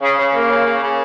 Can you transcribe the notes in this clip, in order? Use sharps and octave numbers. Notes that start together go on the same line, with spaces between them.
C#3
C#3
A#3
C#3
C#3
C#3